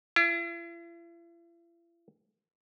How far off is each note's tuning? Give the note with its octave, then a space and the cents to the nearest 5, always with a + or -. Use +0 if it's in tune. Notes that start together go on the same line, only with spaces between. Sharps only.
E4 +45